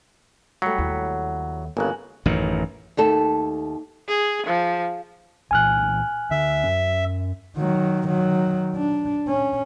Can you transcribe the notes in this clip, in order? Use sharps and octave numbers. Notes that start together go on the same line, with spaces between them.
F#3 G3 A3 G5 B6 C#7
D#2 E4 C#5 F#5
G1 C#3 A#3 A4 G#5 A#5 F#6
A1 F#2 D#3
D#2 A3 A4
G#4
F3
C2 A#2 E3 G#5 F6 F#6
D2 D3 E5
F#2 C#4
D#3 F#3
D#3 F#3
D4
C#4